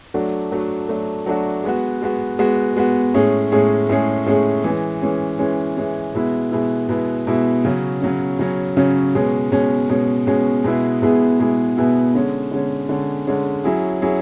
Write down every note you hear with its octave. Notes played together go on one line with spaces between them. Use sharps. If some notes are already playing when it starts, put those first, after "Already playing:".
F#3 A3 D4 F#4
F#3 A3 D4 F#4
F#3 A3 D4 F#4
F#3 A3 D4 F#4
G#3 B3 F#4
G#3 B3 F#4
G#3 B3 F#4
G#3 B3 F#4
A2 G#3 C#4 G#4
A2 G#3 C#4 G#4
A2 G#3 C#4 G#4
A2 G#3 C#4 G#4
E3 G#3 C#4
E3 G#3 C#4
E3 G#3 C#4
E3 G#3 C#4
B2 G#3 B3 E4
B2 G#3 B3 E4
B2 G#3 B3 E4
B2 G#3 B3 E4
C#3 F#3 C#4
C#3 F#3 C#4
C#3 F#3 C#4
C#3 F#3 C#4
B2 G#3 C#4
B2 G#3 C#4
B2 G#3 C#4
B2 G#3 C#4
B2 G#3 B3 E4 G#4
B2 G#3 B3 E4 G#4
B2 G#3 B3 E4 G#4
B2 G#3 B3 E4 G#4
D3 G#3 C#4
D3 G#3 C#4
D3 G#3 C#4
D3 G#3 C#4
F#3 C#4 E4 G#4
F#3 C#4 E4 G#4